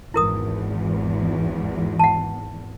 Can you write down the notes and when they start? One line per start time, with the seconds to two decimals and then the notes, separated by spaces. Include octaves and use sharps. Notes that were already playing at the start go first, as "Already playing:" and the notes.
0.14 G#1 E2 E4 A#4 D#6
1.99 F#5 A5